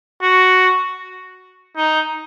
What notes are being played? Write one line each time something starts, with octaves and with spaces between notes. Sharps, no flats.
F#4
D#4